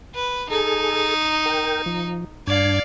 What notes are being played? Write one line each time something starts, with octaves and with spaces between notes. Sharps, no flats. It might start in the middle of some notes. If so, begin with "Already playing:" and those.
B4
D#4 G#4 A4
A#4 G5
F3
G2 D4 D5 F5 G#6